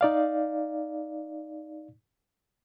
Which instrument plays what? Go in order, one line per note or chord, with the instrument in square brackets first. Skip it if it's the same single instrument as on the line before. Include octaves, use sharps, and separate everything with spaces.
[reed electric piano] D#4 D5 F5